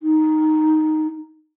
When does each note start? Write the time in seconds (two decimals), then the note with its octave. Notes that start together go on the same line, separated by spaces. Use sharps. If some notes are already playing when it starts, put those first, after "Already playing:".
0.02 D#4